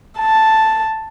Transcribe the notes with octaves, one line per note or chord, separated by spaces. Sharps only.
A5